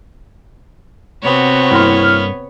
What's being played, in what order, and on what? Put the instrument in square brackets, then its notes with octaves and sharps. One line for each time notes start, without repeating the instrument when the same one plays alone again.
[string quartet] C3 C4 F#4 [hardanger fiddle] B3 C#5
[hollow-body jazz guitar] G2 A#3 C6 [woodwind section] E4 F6